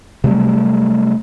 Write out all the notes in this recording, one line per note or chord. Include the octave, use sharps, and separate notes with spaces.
C3 F#3 G3 A3